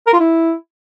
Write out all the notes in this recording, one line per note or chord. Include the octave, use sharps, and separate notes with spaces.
A#4
F4
E4